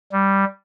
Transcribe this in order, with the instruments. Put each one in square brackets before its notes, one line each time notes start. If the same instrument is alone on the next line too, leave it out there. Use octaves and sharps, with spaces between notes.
[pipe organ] G3